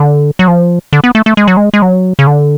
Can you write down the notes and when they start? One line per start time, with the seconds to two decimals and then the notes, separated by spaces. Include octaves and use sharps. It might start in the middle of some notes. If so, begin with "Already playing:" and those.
Already playing: D3
0.39 F#3
0.48 F3
0.93 D3
1.04 B3
1.15 A3
1.26 A3
1.37 G#3
1.48 F#3
1.57 G#3
1.74 G#3
1.82 F#3
2.19 C#3
2.27 D3